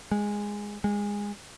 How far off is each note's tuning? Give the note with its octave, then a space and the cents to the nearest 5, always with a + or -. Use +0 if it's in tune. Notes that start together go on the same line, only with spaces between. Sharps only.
G#3 -10
G#3 -20